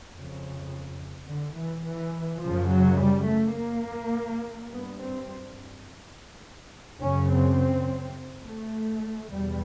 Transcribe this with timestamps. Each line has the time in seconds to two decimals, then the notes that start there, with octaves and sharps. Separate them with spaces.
0.14 F2 C#3
1.28 D3
1.57 E3
1.86 E3
2.43 F#2 C#3 F3
2.71 F#3
3.00 G3
3.29 A3
3.57 A#3
4.72 G2 B3
5.00 C4
7.01 F#2 C#3 C#4
7.30 C4
8.44 A3
9.30 E2 B2 G3